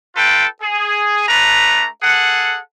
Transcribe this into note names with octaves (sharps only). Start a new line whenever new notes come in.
F4 A4 B4 G5
G#4
A3 D4 B4 A#5
G#4 A4 F#5